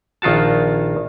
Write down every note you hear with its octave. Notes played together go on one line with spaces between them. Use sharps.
A#1 D#3 F4 F#4 A5